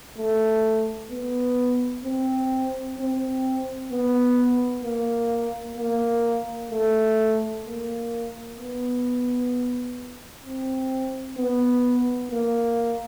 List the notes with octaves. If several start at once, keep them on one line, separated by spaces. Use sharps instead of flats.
A3
B3
C4
C4
B3
A#3
A#3
A3
A#3
B3
C4
B3
A#3